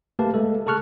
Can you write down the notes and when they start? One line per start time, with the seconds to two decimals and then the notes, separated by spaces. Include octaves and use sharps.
0.19 A3 A#3 G4 B4 F5 A5
0.34 G#3 A3 A4
0.66 G#4 A4 A5 C#6 F6 F#6